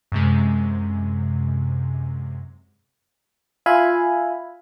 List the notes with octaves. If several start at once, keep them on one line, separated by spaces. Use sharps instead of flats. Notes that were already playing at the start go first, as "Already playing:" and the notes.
F#2 C3 G#3
F4 E5 F5 G#5 B5